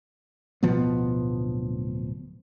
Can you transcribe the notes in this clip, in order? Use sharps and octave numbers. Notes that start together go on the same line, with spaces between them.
D1 B2 F3 B3